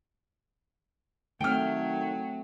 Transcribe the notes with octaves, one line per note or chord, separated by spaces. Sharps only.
D#3 F#3 A3 C4 G5 F6